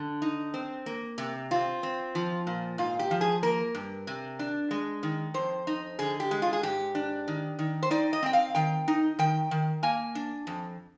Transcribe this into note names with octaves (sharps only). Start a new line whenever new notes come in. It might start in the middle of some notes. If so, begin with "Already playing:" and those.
Already playing: D3
D#4
C4
A#3
C3
C4 F4
C4
F3
A#2
G#2 F4
G4
F3
G#4
A#3 A#4
G2
C3
D4
G#3
D#3
F2 C5
D#4
D3 G#4
G4
G#3
F4
G#4
G#2 G4
D4
D#3
D#3
C5
D#4 D5
D#5
C4 G5
F5
D#3 G5
D#4
D#3 G5
D#3
A#3 G#5
D4
F2